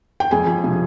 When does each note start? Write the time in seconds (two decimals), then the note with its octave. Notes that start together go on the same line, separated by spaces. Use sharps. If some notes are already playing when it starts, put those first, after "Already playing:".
0.20 G5
0.31 F2 G#4 G#5
0.47 F3
0.64 C3